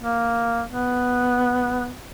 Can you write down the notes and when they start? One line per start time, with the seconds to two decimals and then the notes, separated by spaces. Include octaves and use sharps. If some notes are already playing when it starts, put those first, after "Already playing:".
0.02 A#3
0.70 B3